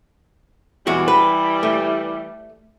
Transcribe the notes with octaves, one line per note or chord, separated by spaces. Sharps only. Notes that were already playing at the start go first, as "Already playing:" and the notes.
E2 E3 G3 G#3 F#4
B4
A3